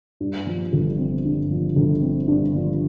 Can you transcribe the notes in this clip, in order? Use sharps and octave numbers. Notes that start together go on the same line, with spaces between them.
G2
F3
G1
C4
G2
F3
G1
C4
G2
F3